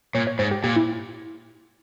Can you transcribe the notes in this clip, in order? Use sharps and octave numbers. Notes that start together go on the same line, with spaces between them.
A#2 C#5
C#5
G#2 C5
G4
A#2 G4
E4